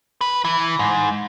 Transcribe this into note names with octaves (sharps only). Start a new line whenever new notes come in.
B4
E3
G#2